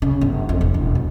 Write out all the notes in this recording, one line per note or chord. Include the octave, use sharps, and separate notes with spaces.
C#3
G1
F2
E1
E1
B2